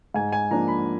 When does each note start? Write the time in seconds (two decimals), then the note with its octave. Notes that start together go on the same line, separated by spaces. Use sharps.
0.14 G#2 G#5
0.33 G#5
0.51 F3 A#3 D4 A#5
0.68 B5